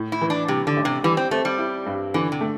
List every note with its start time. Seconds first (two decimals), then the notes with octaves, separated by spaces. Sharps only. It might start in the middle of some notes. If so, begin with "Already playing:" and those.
Already playing: A2
0.12 E4
0.21 E3
0.30 D4
0.48 C3 G3
0.67 D3
0.76 A1
0.85 C3
1.03 E3 G3
1.17 C4
1.31 A3 C4
1.45 G3
1.58 E4
1.86 G2
2.14 D3 E3
2.32 C3
2.41 A3